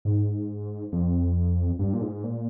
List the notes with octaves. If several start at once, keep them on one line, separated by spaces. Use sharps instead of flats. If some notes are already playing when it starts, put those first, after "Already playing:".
G#2
F2
G2
A#2
G#2
A#2